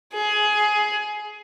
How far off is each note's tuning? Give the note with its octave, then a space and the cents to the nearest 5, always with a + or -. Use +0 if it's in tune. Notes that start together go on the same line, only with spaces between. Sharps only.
G#4 +15